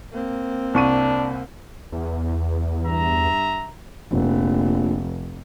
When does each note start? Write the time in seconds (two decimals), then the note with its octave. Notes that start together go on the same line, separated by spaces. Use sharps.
0.13 A#3 C4
0.74 C2 D4 C#6 D#7
1.92 E2
2.85 G2 E5 A#5
4.11 F1 A#1